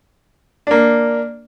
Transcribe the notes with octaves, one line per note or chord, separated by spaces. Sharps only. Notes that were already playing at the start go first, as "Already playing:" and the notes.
A#3 D4